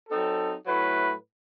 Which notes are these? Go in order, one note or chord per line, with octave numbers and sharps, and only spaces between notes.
F#3 C4 D#4 A4
A2 F#3 A3 E4 B4